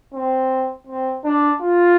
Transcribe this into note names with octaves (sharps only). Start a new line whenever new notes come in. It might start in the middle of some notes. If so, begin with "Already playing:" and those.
C4
C4
D4
F4